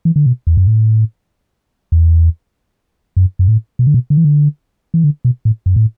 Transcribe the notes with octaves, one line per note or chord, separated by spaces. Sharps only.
E3
D3
B2
E2
F#2
A2
E2
F#2
F#2
A2
B2
D3
B2
D3
E3
D3
E3
D3
B2
A2
F#2
A2